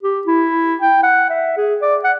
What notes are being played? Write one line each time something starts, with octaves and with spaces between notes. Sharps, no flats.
G4
E4
G5
F#5
E5
G#4
D5
F#5